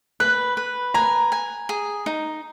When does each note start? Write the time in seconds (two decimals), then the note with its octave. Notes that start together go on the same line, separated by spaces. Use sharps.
0.20 B4 F#6
0.57 B4
0.94 G#5 A#5
1.32 G#5
1.69 G#4
2.06 D#4